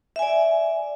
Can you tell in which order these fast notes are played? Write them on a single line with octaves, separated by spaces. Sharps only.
E5 G#5 D5